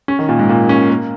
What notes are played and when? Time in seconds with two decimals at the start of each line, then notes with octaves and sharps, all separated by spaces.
0.08 C#4
0.19 D#3
0.29 A#2
0.39 G#2
0.49 A#2
0.69 C#4
0.90 A#3